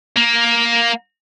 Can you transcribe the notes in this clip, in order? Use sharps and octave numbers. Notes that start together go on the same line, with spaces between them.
A#3